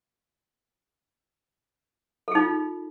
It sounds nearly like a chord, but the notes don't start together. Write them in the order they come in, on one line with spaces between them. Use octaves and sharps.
A4 G#4 D#4 F4